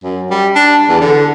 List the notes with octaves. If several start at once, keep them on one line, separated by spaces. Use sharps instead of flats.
F#2
G3
D4
E2
D3